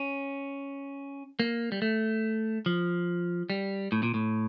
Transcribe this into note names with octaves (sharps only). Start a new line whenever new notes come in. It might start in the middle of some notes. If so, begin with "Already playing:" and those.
Already playing: C#4
A#3
G3
A3
F3
G3
A2
A#2
A2